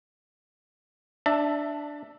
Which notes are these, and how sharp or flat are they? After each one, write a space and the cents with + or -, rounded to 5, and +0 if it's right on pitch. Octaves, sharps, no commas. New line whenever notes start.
D4 +0 E5 +0 A5 +30